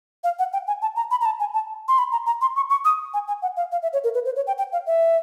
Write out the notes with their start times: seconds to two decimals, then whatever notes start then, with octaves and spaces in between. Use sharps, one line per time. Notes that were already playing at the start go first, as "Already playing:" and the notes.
0.24 F5
0.39 F#5
0.53 G5
0.67 G#5
0.82 A5
0.96 A#5
1.11 B5
1.21 A#5
1.26 A5
1.40 G#5
1.54 A5
1.88 C6
1.98 B5
2.12 A#5
2.26 A#5
2.41 C6
2.56 C#6
2.70 C#6
2.85 D#6
3.14 G#5
3.28 G#5
3.42 F#5
3.57 F5
3.72 F5
3.82 E5
3.93 C#5
4.04 A#4
4.14 B4
4.25 C5
4.36 C#5
4.47 G5
4.58 G5
4.73 F5
4.87 E5